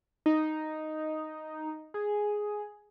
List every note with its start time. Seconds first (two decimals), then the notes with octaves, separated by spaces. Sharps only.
0.26 D#4
1.94 G#4